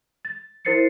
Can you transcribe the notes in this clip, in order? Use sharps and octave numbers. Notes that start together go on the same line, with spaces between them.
A6
E4 A#4 C5 A6 C7 C#7